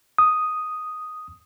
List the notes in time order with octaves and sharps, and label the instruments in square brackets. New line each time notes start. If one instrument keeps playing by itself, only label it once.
[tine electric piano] D#6